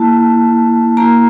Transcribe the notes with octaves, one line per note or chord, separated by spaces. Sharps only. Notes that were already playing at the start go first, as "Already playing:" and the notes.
Already playing: A#3 E4 A5
A#3 E4 A#5